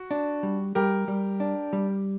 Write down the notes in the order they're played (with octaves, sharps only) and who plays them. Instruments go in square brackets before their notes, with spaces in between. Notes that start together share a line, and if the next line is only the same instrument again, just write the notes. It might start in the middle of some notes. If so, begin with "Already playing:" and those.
Already playing: [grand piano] F#4
[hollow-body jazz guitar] D4
G3
[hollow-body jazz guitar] G3 [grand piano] G4 A#4
[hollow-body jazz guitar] G3
D4
G3